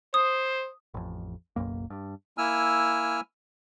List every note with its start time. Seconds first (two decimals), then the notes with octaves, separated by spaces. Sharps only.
0.14 C5 D#6
0.94 A1 F2
1.56 F#1 B1 F#2 A#3
1.90 G2
2.38 A#3 E4 G#5 E6 F6